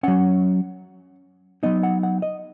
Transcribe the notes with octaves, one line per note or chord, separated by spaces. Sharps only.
F#3 C#4 F#5
F#3 B3 D#4 D#5
F#5
F#5
D#5